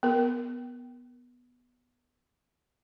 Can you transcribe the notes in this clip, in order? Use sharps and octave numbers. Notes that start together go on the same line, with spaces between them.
B3 A#4